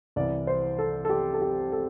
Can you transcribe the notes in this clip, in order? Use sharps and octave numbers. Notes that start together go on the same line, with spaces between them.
C2 C3 E3 D5
C5
A4
A4
G4
A4
G4
A4